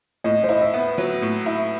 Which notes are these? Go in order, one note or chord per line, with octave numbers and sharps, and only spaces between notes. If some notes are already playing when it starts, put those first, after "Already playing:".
A2 D#5
C5
E4 D#5
E5
B3
F#3
A2
E4